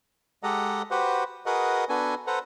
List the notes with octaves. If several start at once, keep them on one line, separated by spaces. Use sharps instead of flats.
G#3 G4 A4 D#5 F#5 A#5
F#4 G4 B4 C5 F#5
F#4 G#4 A#4 B4 D#5 F#5
B3 D4 F#4 A4 B4 G#5
A4 B4 C5 F#5 A#5